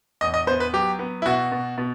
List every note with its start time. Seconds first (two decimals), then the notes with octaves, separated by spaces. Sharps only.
0.21 E2 D#5
0.34 D#5
0.47 B3 C5
0.60 B4
0.73 F#3 G4
0.99 B3
1.22 E4
1.26 B2 F#4
1.52 B2
1.78 B2